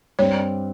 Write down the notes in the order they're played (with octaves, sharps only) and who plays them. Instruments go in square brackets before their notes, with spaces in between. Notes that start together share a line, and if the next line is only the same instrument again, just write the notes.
[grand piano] G2 G3 C4 [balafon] C#5